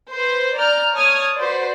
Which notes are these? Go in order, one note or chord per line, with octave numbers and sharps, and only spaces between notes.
B4 C5
D5 A#5 F6 G6
C#5 A5 D#6 F6 G#6
F#4 B4 C5 D5